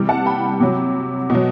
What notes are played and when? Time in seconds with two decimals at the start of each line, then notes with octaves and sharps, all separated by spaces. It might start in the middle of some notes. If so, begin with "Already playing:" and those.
Already playing: C3 E3 G3
0.09 F#5 A5
0.26 G5 B5
0.60 C3 F#3
1.30 B2 F#3